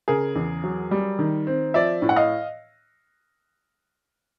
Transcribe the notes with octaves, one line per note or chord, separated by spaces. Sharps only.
C#3 G#4 A#4
E2
F#3
G3
D#3
C4
F3 D5 E5
A2
F#5
D#5 F5